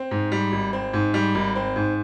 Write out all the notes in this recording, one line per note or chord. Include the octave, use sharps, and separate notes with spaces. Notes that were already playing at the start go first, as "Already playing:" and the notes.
Already playing: C4
G#2
G3
G#1
C4
G#2
G3
G#1
C4
G#2